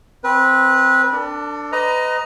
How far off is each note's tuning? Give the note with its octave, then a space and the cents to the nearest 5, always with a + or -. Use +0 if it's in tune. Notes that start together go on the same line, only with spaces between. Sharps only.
C4 +0 B4 -20
D4 +0 A4 +40
B4 +35 D#5 +0 A#5 +10